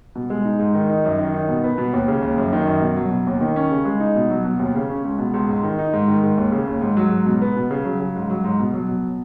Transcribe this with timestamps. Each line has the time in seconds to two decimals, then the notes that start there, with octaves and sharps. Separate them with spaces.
0.15 B2
0.30 G#3
0.45 D#4
0.59 G#2
0.75 D#3
0.89 D#4
1.05 F#2
1.19 D#3
1.34 D#4
1.49 B2
1.64 B3
1.78 B2
1.93 D#2
2.08 C#3
2.22 D#2
2.38 F#2
2.53 D#3
2.67 F#2
2.81 B2
2.97 F#3
3.11 B2
3.27 D#2
3.41 D#3
3.56 C#4
3.71 C#3
3.85 G#3
4.00 D#4
4.16 B2
4.30 F#3
4.45 B2
4.59 D#2
4.75 C#3
4.90 C#4
5.05 C#2
5.19 B2
5.34 C#2
5.48 G#2
5.63 D#3
5.79 D#4
5.93 G#2
6.08 D#3
6.23 G#2
6.38 D#2
6.52 C#3
6.67 D#2
6.81 G#2
6.97 F#3
7.11 G#2
7.26 B2
7.41 B3
7.56 B2
7.71 C#3
7.85 F#3
8.00 C#3
8.15 G#2
8.30 F#3
8.44 G#2
8.59 B2
8.74 F#3
8.89 B2